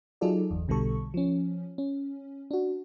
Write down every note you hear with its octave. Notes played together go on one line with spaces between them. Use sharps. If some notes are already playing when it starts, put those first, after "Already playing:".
F#3 D#4 F4 G#4 A4 D5
G1 E2
B1 B2 D3 G3 A4 C#6
F3 C#4
C#4
D4 F#4